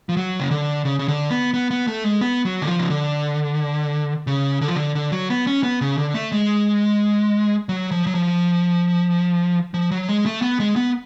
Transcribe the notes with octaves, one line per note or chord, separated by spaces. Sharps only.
F3
F#3
C#3
D3
C#3
C#3
D3
B3
B3
B3
A3
G#3
B3
F#3
D3
F3
C#3
D3
C#3
D3
F3
D3
D3
F#3
B3
C#4
B3
C#3
D3
A3
G#3
F#3
F3
F#3
F3
F3
F#3
G#3
A3
B3
G#3
B3